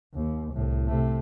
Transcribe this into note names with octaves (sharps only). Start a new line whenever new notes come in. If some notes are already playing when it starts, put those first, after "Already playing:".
D#2
C2 A2
C3 A3